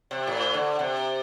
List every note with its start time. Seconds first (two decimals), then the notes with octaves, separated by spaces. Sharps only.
0.11 C3
0.27 A2
0.54 D3
0.79 C3